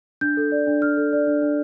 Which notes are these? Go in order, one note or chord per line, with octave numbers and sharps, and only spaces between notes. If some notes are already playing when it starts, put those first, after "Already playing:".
D4 G6
A4
D5
D4
D4 F6
A4
D5
D4
D4